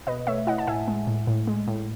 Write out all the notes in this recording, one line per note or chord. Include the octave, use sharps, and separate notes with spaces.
B2 B4 D#5
A3 C#5 E5
E4 D#5 F#5
A5
A2 E5 G#5
G#3
A2
A2
G#3
A2